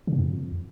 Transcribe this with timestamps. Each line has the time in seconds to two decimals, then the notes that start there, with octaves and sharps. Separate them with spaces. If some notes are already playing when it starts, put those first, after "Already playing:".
0.07 C#3
0.13 B2
0.18 F2